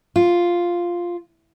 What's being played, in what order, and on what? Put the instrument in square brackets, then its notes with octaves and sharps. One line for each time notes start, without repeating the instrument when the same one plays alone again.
[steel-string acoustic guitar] F4